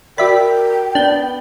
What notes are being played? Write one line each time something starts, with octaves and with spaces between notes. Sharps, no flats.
F#4 A#4 D5 E5 G5 B5
B3 D4 G6